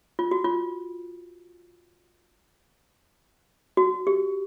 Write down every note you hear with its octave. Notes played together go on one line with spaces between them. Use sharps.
F4
F#4
F4
F#4
G4